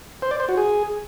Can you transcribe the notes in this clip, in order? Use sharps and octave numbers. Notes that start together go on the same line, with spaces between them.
C5
D5
C5
F#4
G#4